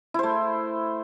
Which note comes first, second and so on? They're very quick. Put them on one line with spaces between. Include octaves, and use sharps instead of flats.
E4 C5 A3